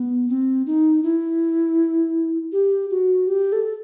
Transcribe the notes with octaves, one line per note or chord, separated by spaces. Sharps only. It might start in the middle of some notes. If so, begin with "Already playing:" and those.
Already playing: B3
C4
D#4
E4
G4
F#4
G4
A4